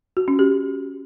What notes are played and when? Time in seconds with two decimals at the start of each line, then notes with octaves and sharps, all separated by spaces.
0.17 F#4
0.28 C#4
0.39 G4